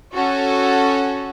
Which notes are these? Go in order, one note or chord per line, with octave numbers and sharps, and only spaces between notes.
C#4 F#4 A4